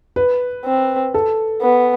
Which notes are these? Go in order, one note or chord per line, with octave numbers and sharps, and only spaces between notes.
B4
C4
A4
B3